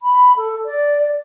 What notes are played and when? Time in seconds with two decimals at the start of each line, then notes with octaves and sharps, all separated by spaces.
0.02 B5
0.37 A4
0.65 D5